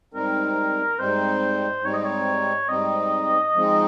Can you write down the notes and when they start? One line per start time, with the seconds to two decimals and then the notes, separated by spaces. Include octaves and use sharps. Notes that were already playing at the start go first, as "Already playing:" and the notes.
0.14 G#2 G3 C4 D#4 A#4
0.99 G#2 G3 C4 D#4 C5
1.84 G#2 G3 C4 D#4 C#5
1.94 D#5
2.05 C#5
2.69 G#2 G3 C4 D#4 D#5
3.54 F3 G#3 C4 D#4